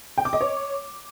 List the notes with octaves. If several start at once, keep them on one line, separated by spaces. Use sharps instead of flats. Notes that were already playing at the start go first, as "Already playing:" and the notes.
G5
D6
D#5
C#5